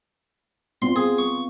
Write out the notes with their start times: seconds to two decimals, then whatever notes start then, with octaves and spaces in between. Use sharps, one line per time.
0.82 B3 C4 F4 C6
0.96 G#4
1.18 C#6